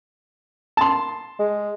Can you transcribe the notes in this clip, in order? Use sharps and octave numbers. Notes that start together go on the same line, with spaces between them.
A5 C6
G#3